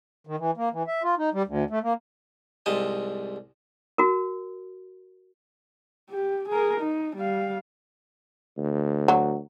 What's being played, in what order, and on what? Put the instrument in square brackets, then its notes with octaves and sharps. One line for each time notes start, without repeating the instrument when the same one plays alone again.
[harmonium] D#3
E3
A#3
E3
E5
F4
D#4
G3
D2
A3
A#3
[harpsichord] C2 G#2 C3 D#5 A5
[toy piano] F#4 A#4
[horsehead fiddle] G4
G#4 A#4
D#4
G3 F5
[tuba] D2
[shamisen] F#3